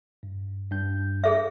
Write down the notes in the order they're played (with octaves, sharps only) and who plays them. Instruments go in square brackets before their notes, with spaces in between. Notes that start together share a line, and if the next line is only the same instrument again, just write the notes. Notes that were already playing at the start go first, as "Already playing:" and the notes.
[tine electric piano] G2
G2 G6
[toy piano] G#4 A4 E5